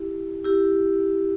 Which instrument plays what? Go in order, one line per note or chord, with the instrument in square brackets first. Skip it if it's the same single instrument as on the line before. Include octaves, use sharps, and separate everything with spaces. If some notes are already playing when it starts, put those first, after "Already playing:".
Already playing: [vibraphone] E4 G4
E4 G4